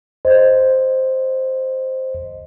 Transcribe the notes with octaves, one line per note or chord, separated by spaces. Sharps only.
C5 D#5